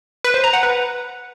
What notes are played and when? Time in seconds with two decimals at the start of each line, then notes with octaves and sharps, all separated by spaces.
0.24 B4
0.34 C5
0.44 A#5
0.53 F#5
0.63 B4